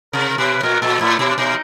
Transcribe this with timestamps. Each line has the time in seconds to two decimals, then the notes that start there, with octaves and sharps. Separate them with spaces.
0.13 C3 A#4
0.29 A#4
0.38 B2 B4
0.54 B4
0.63 A#2 A#4
0.82 A#2 A4
1.00 A2 E4
1.19 B2 E4
1.30 D4
1.38 B2 D#4